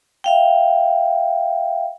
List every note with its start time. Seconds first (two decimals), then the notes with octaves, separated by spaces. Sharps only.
0.24 E5 F5 G5